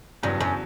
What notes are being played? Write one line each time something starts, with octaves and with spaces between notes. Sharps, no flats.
E2 G2 C#3 F#3
F#2